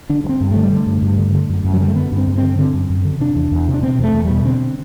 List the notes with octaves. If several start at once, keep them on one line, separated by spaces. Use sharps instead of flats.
D3 D4
G2
C4
G2
D3 A3
G3
D3 A3
G2
G2
D3
D3
F#2
F#2
F#3
D3 G3
A3
D3 B3
G2
C4
G2
C4
D3
D3 C4
F#2
F#2
D3
C3 D4
E2
E2
C3
D4
B2 C4
E2 A3
E2
B2 G3
D3 C4